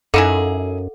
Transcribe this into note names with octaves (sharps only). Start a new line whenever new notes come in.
F#2 D#4 E4 G#4 A4 F5 F#5